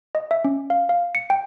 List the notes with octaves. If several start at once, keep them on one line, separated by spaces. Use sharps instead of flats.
D#5
E5
C#4
F5
F5
C#7
G5